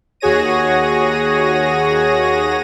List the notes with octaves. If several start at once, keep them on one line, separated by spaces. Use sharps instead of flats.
D#2 F#4 G#4 C#5 A#6 D#7